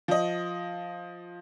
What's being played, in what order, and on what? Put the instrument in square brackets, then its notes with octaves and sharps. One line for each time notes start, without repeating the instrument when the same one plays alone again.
[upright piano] F3 D#5